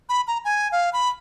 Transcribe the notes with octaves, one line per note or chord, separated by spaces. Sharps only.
B5
A#5
G#5
F5
B5